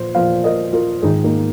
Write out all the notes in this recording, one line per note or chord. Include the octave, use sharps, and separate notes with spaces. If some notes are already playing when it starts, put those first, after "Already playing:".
Already playing: A#2 F3 C5
A#2 F3 C5 F5
A#4 D#5
F4 A#4
G#2 D#3 D#4 G#4
A#3 D#4